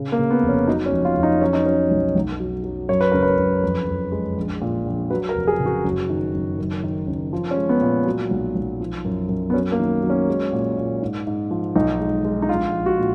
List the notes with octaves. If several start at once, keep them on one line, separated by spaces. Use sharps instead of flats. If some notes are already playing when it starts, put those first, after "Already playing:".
Already playing: C#3
A#3
C#3
B3
F1
C#4
F#3 D#4
C#4
F2
F4
F2
D#4
F#3 C#4
D#4
F#3 C#4
B1
B1
F#3
F#3
F#2 C#5
B4
F#1 A#4
B4
F#1
F2
F2
G#3
A#1
A#2
A#1
F#3 B4
A#4
F1
G#4
C#3
F#4
F#1
D#3
F#1
F#2
D#3
F#1
F3
C#4
G#3
B3
A#2
F#3
B1
B1
F3
F#2
F#2
B3
F#3 C#4
A#3
D#3
F#3
C#4
G#3
A#2
A#2
G#2
G#2
F3
B1 D#4
G#3
G#3
D#4
A#1 F4
A#1
F#4
A#2